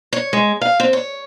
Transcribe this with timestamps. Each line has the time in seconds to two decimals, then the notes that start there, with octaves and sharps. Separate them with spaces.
0.13 C#5
0.33 G#3
0.61 F5
0.80 C4
0.93 C#5